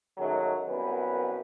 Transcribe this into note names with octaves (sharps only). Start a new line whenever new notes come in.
G#2 D#3 F#3 G#3 A3 C#4
C2 F#2 B3 B4